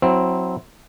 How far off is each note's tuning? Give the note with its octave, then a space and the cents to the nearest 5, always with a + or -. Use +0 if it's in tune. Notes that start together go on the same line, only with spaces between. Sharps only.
F#3 -15 C4 +0 E4 -25